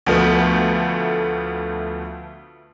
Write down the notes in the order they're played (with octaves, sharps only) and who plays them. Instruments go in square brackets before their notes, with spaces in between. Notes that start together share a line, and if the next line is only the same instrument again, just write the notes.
[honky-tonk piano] D2 F3 A3 B3